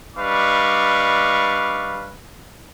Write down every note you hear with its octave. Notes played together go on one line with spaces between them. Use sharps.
G3 D4 B4 D#5 F5 C#6